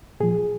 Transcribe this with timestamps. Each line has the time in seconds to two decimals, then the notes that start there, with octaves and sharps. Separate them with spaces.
0.20 A#2 F3 G#4